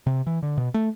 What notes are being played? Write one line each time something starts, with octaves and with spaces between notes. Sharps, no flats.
C3
E3
D3
B2
A3